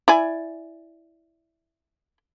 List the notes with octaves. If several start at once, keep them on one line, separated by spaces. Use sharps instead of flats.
E4 D5 G#5